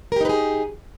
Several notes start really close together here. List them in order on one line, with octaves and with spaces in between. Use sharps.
A#4 G4 D#4 B4 G#4